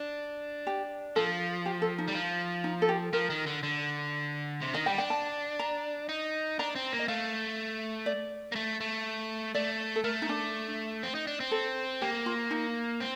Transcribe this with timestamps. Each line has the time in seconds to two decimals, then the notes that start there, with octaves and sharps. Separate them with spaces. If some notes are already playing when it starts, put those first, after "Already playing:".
Already playing: D4
0.67 G4
1.16 F3 A4
1.66 G4
1.82 A4
1.98 D#4
2.08 G3
2.15 F3
2.64 D#4
2.82 A4
2.89 G4
3.13 F3 A#4
3.30 D#3
3.46 D3
3.63 D3
4.61 C3
4.73 D#3 D#5
4.86 G3 G5
4.98 D4 G5
5.10 A5
5.59 A#5
6.09 D#4
6.59 D4 A#5
6.75 C4
6.92 A#3
6.99 D#5
7.08 A3 F5
8.06 D5
8.52 A#3
8.56 A3
8.80 A3
9.54 A3 D5
9.96 A4
10.04 A3 A#4
10.22 D#4
10.29 D4
11.03 C4
11.15 D#4
11.27 D4
11.40 C4
11.51 A4
12.02 A#3 G4
12.26 F4
12.51 D#4
13.00 C4